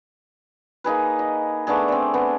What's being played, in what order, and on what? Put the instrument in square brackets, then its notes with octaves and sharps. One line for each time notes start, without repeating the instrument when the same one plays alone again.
[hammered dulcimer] A#3 D#4 G#4 B4
D#5
A3 B3 D4 G#4
C4 D5
B3 C4